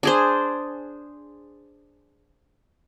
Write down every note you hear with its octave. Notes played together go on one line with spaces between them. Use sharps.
D4 G#4 C5